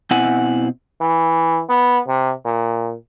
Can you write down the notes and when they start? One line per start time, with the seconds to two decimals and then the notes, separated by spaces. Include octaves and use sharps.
0.11 B2 C4 E4 F#5 G#5
1.01 E3
1.69 B3
2.08 C3
2.45 A#2